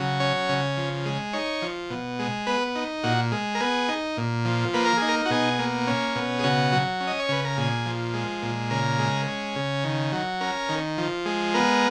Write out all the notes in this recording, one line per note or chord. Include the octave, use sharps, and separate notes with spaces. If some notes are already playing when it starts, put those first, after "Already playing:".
Already playing: C#3 F#3
C#4 C#5
C#3
F3
G#3
D#4 C#5
F3
B2
G#3
B3 B4
D#4
A#2 F#4
G#3
A#4
B3 G#4
D#4
A#2
F3
A#3 B4
A#4
D#4 G#4
A#4
F#4
B2 G#4
A#3
C#4
B2
G#4
C#3 F#4
F#3
C#4
D#5
C#5
C#3 B4
A#4
A#2 G#4
F3
G#3
A#2
C#3 A#4
G#3
C#4
C#3
D#3
F#3
C#4 A#4
D#3
F3
G#3
B3 A#4